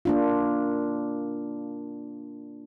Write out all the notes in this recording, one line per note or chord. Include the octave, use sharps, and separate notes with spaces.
A#3 D4 F4